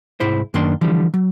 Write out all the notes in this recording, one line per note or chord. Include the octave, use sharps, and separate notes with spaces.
C2 G#2 E4 C5
F#2 D#3 A#3 D4 C6
D3 E3 F3 G3
F#3